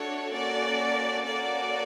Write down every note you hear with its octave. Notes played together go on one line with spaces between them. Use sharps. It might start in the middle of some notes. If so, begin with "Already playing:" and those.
Already playing: A3 D4 F#4 A4 C#5
A#3 C#4 F#4 A4 D5
A#3 C#4 F#4 A4 D5